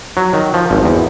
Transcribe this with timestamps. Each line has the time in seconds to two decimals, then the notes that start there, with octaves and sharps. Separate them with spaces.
0.17 F#3
0.34 D#3
0.54 F3
0.71 G#1
0.84 E2